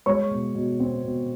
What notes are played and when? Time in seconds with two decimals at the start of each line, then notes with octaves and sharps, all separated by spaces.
0.06 G#3 C#5 C#6
0.31 B2
0.54 B2
0.80 C4
1.03 B2